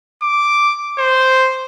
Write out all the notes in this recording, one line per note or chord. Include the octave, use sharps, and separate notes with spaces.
D6
C5